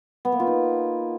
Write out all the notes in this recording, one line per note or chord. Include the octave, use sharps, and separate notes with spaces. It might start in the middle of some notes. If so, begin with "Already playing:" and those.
B3
A#3
F4
D#4